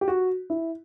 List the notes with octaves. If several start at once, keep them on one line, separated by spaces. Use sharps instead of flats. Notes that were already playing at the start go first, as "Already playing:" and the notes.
G4
F#4
E4